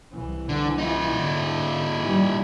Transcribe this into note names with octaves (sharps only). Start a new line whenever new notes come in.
C2 E3
D3
D#4 F4
G#2 D3
E3 G3